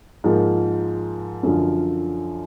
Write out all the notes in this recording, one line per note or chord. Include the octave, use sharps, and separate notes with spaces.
G#2 F3 A#3
F#2 D3 F3